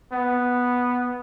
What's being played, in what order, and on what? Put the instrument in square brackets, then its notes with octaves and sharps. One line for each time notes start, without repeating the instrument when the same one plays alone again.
[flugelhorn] B3